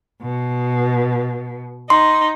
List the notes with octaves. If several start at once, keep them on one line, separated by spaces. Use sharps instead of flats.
B2
D#4 C6